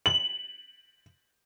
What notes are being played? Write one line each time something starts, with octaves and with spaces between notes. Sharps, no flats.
F#7